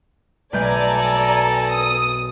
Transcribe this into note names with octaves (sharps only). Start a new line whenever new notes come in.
B1 A3 A4 D5 G#5 A#5 G6
D#6